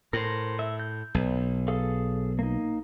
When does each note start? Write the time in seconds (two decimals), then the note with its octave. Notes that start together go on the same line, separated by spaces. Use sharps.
0.13 A2 A#4 C5
0.59 E5
0.79 G6
1.15 B1
1.68 G#4 A4 F5
2.39 A#3 D#4